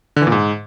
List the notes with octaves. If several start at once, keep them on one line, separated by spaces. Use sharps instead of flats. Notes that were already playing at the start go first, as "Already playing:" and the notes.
D3
E3
A#2
G#2